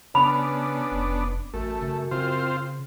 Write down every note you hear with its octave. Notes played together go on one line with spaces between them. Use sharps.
C#3 B3 C#4 D4 B5
F1
A1 F#2 A3
C#3
C#3 C4 F4 C5